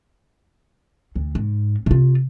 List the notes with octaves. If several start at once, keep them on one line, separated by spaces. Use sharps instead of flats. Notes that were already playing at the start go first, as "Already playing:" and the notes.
D2
G#2
C3 F4